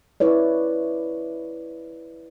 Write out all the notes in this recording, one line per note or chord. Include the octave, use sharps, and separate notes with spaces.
E4 B4 C#5 D5